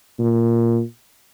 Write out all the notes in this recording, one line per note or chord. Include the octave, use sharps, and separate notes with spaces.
A#2